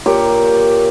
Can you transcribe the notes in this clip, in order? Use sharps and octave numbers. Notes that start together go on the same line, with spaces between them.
A#2 G4 C#5 G5